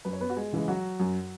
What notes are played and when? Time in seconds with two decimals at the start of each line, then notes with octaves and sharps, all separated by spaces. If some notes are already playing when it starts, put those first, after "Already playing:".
0.05 F#2 B4
0.13 C#5
0.21 B3 B4
0.30 F#4
0.36 G#3 G#4
0.53 C#3 E3 G#3
0.68 F#3 F#4
1.00 F#2